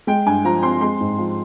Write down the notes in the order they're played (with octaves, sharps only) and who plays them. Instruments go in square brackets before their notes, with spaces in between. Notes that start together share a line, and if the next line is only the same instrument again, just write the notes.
[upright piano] G#3 G5
G2 G#5
F3 A#5
C4 C6
G#3 C6
G#2
F3